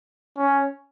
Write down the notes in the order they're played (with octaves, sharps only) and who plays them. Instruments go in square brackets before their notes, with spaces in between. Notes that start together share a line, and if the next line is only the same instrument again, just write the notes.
[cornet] C#4